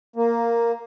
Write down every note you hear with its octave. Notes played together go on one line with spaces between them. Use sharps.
A#3